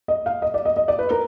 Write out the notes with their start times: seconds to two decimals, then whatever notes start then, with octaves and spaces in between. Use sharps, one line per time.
0.08 D#5
0.26 F5
0.42 D#5
0.54 D5
0.65 D#5
0.76 D#5
0.88 D5
0.99 B4
1.11 A#4